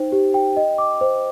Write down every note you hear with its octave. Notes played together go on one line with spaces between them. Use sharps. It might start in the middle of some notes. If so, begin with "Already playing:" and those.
Already playing: D#4 C5 G5
G4
G5
D#5
D6
C5